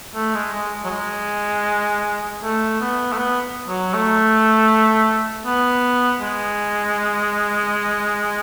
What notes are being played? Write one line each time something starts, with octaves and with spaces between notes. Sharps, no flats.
A3
G#3
G#3
F#3
G#3
A3
B3
A3
B3
F#3
A3
B3
G#3